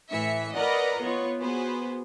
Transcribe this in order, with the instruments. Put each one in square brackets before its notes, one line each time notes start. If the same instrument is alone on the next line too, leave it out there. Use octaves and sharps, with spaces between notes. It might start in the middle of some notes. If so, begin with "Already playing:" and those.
[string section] A2 E3 E5 C#7
A#4 B4 D5 D#5 F#5 A#5
B3 F4 C#5
B3 F#4 G#4 B4 C5